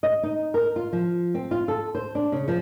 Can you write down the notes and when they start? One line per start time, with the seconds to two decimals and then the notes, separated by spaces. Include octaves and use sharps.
0.03 D#5
0.23 D#4
0.54 A#4
0.76 F4
0.93 F3
1.35 C4
1.51 F4
1.68 A4
1.95 C5
2.15 D4
2.32 C#3
2.48 F3